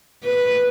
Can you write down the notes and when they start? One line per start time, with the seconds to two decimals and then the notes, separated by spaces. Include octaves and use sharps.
0.24 B4